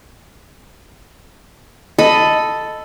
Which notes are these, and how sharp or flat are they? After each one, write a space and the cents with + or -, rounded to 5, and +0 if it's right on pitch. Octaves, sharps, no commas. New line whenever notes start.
A4 +0 D#5 +0 B5 +20